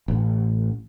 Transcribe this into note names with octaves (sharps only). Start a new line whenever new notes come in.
A1